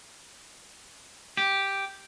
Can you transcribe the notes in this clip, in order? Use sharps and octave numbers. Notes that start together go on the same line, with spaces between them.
G4